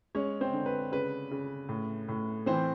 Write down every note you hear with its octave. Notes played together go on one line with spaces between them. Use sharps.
G#3 C#4 C#5
C4 C5
D3
B4
C#3 B4
C#3
A2
A2
E3 C4 C5